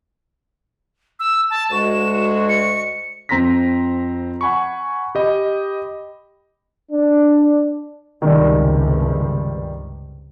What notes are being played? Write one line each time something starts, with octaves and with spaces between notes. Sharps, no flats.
E6
A5
D2 G#3 F#4 E7
C#7
F2 C4 A#5 C6 A#6 B6
F#5 G#5 B5 C#6
G4 D#5 B5
D4
C#2 G2 C3 D#3 G3